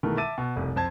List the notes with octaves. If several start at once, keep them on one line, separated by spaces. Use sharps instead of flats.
B2 D#3 E3 G#3 A3 A#4
E5 A5 D6 E6 A6 D#7
B2
F1 C2
F2 C5 A5 G#6